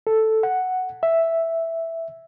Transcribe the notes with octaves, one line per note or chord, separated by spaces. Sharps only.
A4
F#5
E5